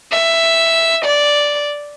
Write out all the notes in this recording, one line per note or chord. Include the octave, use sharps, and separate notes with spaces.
E5
D5